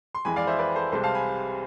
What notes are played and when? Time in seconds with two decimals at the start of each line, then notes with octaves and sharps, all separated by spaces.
0.15 C6
0.25 F2 E3 G#3 G#5 B5
0.36 D5 F5
0.47 C5 E5
0.59 B4 D5
0.75 A4 C5
0.92 C2 C3 G#3 A4 C5
1.03 F5 A5
1.15 G#5 B5